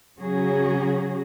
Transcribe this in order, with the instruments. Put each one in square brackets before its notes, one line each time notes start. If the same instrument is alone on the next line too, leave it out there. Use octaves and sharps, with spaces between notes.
[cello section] C#3 F#3 C#4 F#4 G#4